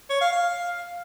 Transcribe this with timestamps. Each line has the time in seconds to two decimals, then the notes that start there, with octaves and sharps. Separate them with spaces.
0.10 C#5
0.21 F5
0.33 F5